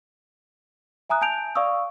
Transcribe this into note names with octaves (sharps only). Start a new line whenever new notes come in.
E5 G#5 A#5 D#6 F#6
G#5 A5 G6 D7 F7
D5 F5 C#6 D#6 E6